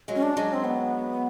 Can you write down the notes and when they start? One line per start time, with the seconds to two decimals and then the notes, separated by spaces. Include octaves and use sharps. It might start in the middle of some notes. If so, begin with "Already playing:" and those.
0.08 F#3 G#3
0.15 C#4
0.23 D4
0.37 F#3 G#3
0.53 C4
0.64 B3